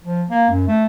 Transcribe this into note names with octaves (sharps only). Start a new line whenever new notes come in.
F3
A#3
F#2
A3